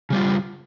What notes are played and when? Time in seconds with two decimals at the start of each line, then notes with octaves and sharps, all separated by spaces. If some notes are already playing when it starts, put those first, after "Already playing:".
0.10 C#3
0.13 G3
0.15 F4